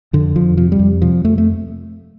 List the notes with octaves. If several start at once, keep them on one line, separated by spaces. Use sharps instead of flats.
F2 D3
F2 F3
C3 F3
G3
F2
C3 F3
F2 A3
A3